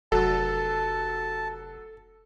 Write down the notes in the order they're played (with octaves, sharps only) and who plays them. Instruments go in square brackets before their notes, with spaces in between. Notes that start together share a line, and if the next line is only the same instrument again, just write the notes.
[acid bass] F1 [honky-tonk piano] F#3 [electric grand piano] A4 [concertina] A5